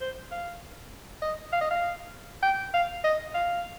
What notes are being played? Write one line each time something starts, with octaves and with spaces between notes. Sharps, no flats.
C5
F5
D#5
F5
D#5
F5
G5
F5
D#5
F5